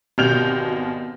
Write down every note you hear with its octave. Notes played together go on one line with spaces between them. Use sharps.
G#1 B2 G4 F6 G6 F7